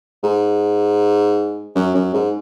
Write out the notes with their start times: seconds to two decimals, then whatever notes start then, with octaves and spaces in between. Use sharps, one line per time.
0.24 G#2
1.75 F#2
1.95 F#2
2.14 G#2